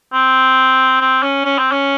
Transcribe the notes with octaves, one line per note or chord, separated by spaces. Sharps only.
C4
C4
C#4
C#4
C4
C#4